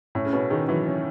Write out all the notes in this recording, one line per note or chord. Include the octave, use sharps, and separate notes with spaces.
A2 C#4
C#3
B2 C#4
D#3 G#4
E3 F#3
C#4